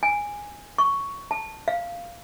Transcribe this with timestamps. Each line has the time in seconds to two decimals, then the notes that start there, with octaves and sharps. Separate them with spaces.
0.03 G#5
0.78 C#6
1.31 A5
1.68 F5